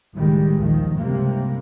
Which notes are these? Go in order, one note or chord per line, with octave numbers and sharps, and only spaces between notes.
C#2 A2 D#3 G3 G#3
A#1 D#2 D#3 F3
C#2 G2 C3 G3 A#3 C4